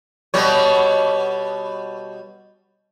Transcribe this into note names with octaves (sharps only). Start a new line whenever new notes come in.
B2 G3 C#5